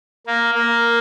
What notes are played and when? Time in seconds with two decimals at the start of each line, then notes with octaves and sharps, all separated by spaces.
0.27 A#3
0.54 A#3